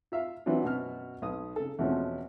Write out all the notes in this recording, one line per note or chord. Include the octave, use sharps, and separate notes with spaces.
F4 E5 F5
E3 F#3 C4 D4 F4
F#2 B2 B3 F#4 F6
B1 D#6
C#3 A4
E2 B2 F3 A3 C4 C#4